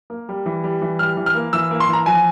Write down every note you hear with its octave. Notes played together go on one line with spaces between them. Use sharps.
A#3
G3
E3
G3
E3
G3 F6
E3
F6
A#3
E3 E6
A#3
C6
E3 A#5
F3 G#5